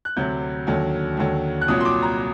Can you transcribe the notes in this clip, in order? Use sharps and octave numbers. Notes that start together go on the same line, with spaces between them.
F#6
D2 C3 F#3 G6
D#2 D3 F#3
D#2 D3 F#3
F#6
C2 A#2 F#3 D#6
C6
D6
A#5